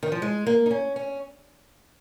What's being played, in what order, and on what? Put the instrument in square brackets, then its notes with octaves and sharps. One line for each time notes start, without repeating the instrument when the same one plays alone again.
[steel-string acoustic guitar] D#3
F3
G#3
A#3
D#4
C#4
C#4